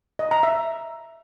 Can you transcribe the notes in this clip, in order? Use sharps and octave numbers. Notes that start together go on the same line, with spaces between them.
D#5
A#5
E5